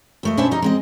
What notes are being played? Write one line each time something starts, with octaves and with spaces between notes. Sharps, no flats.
D#2 A3 D#5
B2 C#4 D4 C5 E5 A5
G3 D#4 D#5
G#3 C4 D#5